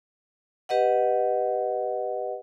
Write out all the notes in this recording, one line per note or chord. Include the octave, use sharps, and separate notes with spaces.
G4 B4 D#5 F#5